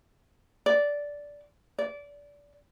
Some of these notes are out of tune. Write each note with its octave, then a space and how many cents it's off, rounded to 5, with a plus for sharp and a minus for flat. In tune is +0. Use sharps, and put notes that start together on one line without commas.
D5 -10
D5 -25